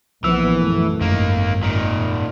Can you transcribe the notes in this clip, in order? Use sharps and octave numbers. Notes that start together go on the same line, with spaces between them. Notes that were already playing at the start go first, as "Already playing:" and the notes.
A#1 E3 F3 B3 E6
F#2 A3
G#1 F#2 D#3 A#3
A#2 D#3